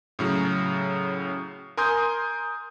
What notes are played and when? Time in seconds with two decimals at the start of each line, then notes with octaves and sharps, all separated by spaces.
0.19 A2 C#3 F#3
1.77 A#4 G#5 C6 D#6 G6